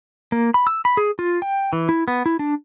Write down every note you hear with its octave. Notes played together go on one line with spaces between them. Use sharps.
A#3
B5
E6
B5
G#4
F4
G5
E3
E4
B3
E4
D4